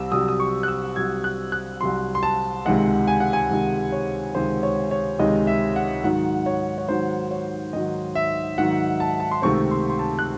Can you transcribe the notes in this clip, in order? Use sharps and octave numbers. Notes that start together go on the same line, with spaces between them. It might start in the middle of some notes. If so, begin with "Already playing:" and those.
Already playing: C2 C3 E6
C2 C3 F#3 D#6
D#6
C#6
F#6
E6
C2 C3 F#3 G#6
F#6
F#6
C2 C3 F#3 C6
C6
A5
C#2 C3 D#3 G#3 F#5
G#5
F#5
G#5
C#2 C3 D#3 G#3
C#5
C#2 C3 D#3 G#3 C5
C#5
C#5
C#2 C3 D#3 G#3 D#5
E5
F#5
G#2 D#3 F#3 F#5
C#5
C#5
G#2 D#3 F#3 C5
C#5
G#2 D#3 F#3 D#5
E5
G#2 D#3 F#3 F#5
A5
A5
C6
C#2 C3 D#3 A3 C4 C#6
C6
C6
A5
F#6